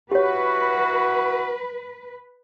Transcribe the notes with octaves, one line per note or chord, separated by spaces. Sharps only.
E4 F#4 G4 B4 C#5